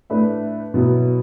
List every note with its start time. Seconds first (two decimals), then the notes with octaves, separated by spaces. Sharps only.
0.10 A2 A3 D4 B4 E5
0.74 B2 F#3 B3 E4